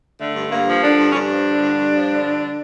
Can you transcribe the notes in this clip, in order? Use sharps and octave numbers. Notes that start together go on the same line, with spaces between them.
D3 A3
G2
G2 A#3
F3
D3 D4
G2
C#4
G2 D4
F3
D3
G2
G2
F3
D3
G2